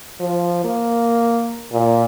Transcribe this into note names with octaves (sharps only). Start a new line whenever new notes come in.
F3
A#3
A#2